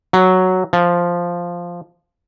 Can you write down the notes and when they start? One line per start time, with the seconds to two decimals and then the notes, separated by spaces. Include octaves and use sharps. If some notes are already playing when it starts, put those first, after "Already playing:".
0.13 F#3
0.73 F3